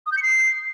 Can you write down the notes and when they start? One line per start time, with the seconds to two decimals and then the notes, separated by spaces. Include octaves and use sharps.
0.06 D#6
0.12 G6
0.17 C#7
0.23 C7